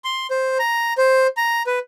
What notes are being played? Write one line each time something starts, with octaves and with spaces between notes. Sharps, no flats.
C6
C5
A#5
C5
A#5
B4